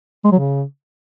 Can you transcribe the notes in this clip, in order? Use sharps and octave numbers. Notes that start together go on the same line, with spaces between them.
G#3
F#3
C#3